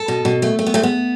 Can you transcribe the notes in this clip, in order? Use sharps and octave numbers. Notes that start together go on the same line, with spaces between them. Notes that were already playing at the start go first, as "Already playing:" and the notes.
Already playing: A4
B2
B2
A3
A3
B3
G#2 A3
B3